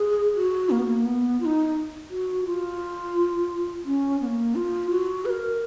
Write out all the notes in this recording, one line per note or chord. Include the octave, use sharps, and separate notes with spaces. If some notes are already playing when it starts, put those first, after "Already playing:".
Already playing: G#4
F#4
A#3
B3
A#3
B3
F4
D#4
F#4
F4
C#4
B3
A#3
F4
F#4
B4
A#4